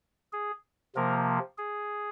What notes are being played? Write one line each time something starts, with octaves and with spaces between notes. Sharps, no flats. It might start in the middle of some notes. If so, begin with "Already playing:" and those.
G#4
C3 F3 A#3 A#4
G#4